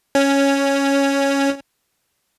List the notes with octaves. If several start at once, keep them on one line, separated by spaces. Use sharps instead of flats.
C#4 C#5